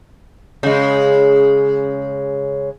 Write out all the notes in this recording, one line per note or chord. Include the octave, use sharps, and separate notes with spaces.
C#3 G#3